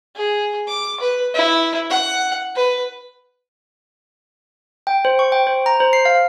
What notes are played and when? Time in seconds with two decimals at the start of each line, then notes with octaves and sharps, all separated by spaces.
0.16 G#4
0.68 D6
1.00 B4
1.34 E4
1.90 F#5
2.56 B4
4.87 G5
5.05 C5
5.19 C#6
5.32 G5
5.47 C5
5.66 A#5
5.80 C5
5.93 C7
6.05 F5